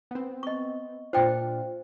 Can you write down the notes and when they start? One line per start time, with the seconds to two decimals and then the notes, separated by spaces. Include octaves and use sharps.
0.11 B3 C4
0.43 D#5 C#6
1.13 A#2 D4 F4 C5 G5